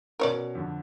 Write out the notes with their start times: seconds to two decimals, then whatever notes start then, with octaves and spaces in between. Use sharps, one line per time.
0.20 B2 C#4 A#4 C#5 D5
0.55 F2 D3